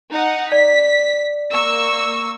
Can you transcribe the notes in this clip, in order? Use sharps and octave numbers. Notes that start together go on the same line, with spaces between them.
D#4 F#5
D5 B6
A#3 C#6 E6